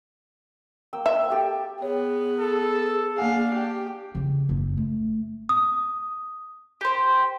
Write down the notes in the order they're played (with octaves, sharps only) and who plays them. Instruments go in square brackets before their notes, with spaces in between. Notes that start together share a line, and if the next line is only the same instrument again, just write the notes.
[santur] A#3 G5 E6
[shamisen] E5
[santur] G4 A4
[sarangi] B3 [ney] G#4 [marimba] C#5
[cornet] A4
[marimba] A#3 F#5 G#5 [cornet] D4 [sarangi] F5
[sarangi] G4
[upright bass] C#3 E3
F#1
A3
[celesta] D#6
[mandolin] G4 C5